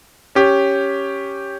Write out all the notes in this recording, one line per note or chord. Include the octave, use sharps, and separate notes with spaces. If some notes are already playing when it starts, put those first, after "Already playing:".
C#4 G4